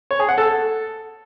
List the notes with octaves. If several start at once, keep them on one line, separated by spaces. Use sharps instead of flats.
C#5
G#4
F#5
A4